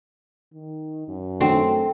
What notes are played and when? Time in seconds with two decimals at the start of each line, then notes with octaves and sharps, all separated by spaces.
0.54 D#3
1.08 F#2
1.41 D#3 A3 C4 D4 F#4